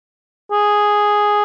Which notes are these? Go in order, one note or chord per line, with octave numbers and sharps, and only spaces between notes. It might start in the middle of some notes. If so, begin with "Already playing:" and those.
G#4